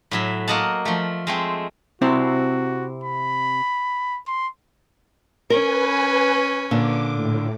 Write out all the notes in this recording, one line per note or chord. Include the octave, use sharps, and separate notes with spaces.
A2 F#3 E5
A#3 F#4 D#5 F#5 A5
F3 A3
G#3 A3 C4
C3 C4 E4 F#4
B5
C6
C#4 A#4 B4 G#5
A#2 D3 D6
A2